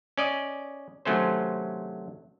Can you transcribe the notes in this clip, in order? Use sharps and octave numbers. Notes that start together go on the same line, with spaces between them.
C#4 D5 D#5
C3 D#3 F#3 A3 C#4 C5